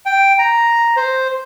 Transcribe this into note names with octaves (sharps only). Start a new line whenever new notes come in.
G5
A#5
C5